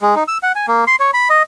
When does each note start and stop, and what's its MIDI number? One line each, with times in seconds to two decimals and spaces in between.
0.01 0.15 56
0.16 0.24 63
0.28 0.38 88
0.43 0.52 78
0.55 0.66 80
0.68 0.84 58
0.87 0.96 84
1.00 1.11 73
1.14 1.28 83
1.30 1.43 75